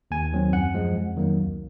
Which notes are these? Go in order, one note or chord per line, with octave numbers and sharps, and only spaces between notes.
D#2 G#5
D#3 F#3 C4
F#2 F#5
F3 G#3
F2
D#3 F#3 A#3
C#2